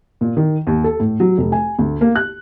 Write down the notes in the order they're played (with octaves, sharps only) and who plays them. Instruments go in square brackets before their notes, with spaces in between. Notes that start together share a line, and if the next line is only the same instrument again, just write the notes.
[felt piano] A#2
D#3
D#2
A4
A2
F#3
F1
G#5
D2
A#3
F#6